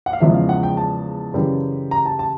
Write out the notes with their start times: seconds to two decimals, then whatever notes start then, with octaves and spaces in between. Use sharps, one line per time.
0.06 F#5
0.13 F5
0.21 E2 C#3 F3 G#3 E5
0.34 F5
0.49 F#5
0.63 G5
0.77 A5
1.34 F#2 C#3 E3 G3
1.91 A#5
2.06 A5
2.19 A5